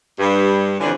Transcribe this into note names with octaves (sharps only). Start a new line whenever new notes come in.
G2
F2 D3 E3 C#4 D4